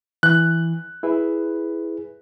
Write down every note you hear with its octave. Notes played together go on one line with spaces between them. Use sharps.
E3 F#6
E4 G#4 B4